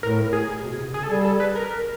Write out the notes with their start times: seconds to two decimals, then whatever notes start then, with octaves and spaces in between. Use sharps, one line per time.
0.02 A2 A#4
0.33 G#4
0.63 B2
0.79 C3
0.94 C#3 G#4
1.03 A4
1.09 G3 G#4
1.25 A4
1.40 B4
1.55 A#4